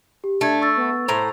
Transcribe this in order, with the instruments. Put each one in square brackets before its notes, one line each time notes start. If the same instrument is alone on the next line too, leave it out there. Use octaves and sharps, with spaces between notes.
[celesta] G4
[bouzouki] A3 [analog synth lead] D4 [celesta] A5 G#6
[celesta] C#6 E6 A6
[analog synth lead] B3
[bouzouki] A2 A#5 [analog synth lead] C5